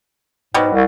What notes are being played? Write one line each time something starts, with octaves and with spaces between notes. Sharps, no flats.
G#2 B2 F#3 G3
C2